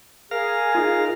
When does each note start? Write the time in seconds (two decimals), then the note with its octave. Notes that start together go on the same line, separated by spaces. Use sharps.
0.31 G#4 A#4 F5
0.75 D#4 F4